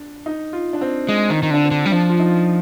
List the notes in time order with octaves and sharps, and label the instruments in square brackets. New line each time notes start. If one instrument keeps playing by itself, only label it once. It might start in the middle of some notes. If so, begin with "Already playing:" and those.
Already playing: [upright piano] D4
D#4
F4
D4
C4
[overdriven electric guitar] G#3
D#3
D#3
[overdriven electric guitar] D3 [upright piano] D4
[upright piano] C4
[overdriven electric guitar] D3
G3
[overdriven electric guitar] F3 [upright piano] D4
[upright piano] F4
D#4